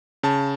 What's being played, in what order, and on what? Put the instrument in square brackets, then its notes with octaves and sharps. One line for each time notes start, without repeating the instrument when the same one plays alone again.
[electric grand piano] C#3 A5